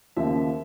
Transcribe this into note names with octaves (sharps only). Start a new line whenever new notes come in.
D#2 C#3 F3 E5